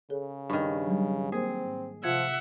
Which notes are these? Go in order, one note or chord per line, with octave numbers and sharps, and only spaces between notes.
C#3 G#4 A4 C#5
G2 D#3
F#3 G3
A#3 C4 G#4 A#4 C5
G#2
C3 F3 F4 E5 F#5 G#6